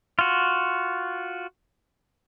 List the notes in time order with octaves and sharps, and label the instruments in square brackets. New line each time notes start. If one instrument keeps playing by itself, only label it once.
[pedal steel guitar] F4 F#4